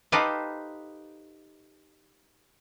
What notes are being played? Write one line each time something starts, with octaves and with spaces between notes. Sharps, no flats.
D#4 G4 A4 B4 C5 F5